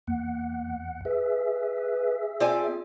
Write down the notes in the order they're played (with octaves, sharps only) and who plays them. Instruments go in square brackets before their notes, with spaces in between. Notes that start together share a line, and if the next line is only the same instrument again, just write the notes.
[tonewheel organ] E2 F#5 [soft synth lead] A#3
[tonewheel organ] G#4 E5 [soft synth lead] B4
[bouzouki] C4 D5 G#5 [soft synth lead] F4